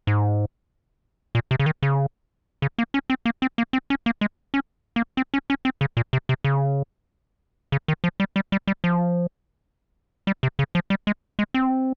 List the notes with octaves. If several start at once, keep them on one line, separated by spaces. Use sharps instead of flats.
G#2
A#2
C3
C#3
D#3
C#3
C#3
A#3
C#4
C4
A#3
C4
A#3
C4
C#4
A#3
G#3
C#4
A#3
C4
C#4
C#4
C4
C#3
A#2
C3
C3
C#3
C#3
D#3
F3
G3
G3
G3
G3
F3
G3
C3
C#3
F3
G3
G#3
G#3
C4